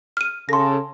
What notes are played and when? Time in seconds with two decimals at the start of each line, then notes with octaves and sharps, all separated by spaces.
0.17 F6 D#7
0.49 C#3 A4 C6 A#6